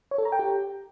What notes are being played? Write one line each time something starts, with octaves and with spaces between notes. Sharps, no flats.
C#5
A4
A#5
G5
G4